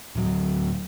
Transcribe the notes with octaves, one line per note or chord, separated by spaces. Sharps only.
D1 F#3